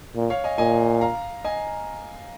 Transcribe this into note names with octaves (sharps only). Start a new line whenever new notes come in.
A#2
C#5 F5
D#5 G#5
A#2 D#5 G#5
F5 A#5
D#5 G#5